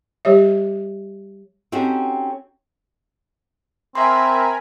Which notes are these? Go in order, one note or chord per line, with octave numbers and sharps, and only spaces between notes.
G3 G4 C#5 E5
C4 C#4 D#4 F#4 G4 A4
C4 A#4 E5 G#5 B5 C6